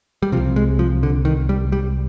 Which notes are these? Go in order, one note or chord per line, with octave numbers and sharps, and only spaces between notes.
G3
C2 C3 F3
G#3
F3
D3
D#3
G3
G3